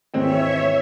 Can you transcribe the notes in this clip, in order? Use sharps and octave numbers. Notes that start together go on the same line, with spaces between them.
G#1 D#2 E3 G#3 C4 C#5 E5 G5